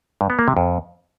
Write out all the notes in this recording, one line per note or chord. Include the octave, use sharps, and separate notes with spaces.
G2
B3
A#3
C3
F2